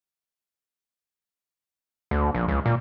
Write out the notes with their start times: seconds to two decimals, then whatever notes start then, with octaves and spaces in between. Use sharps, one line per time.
2.11 D2
2.35 A#1
2.48 C#2
2.66 A#2